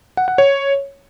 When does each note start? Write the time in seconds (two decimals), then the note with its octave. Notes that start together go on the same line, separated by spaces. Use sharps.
0.17 F#5
0.28 F#5
0.38 C#5